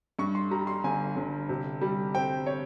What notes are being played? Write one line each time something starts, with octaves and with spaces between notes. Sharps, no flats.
G2 C#6
C6
G3 A#5
C6
G1 G#5
G1
C3
G3
C4 G5
C#5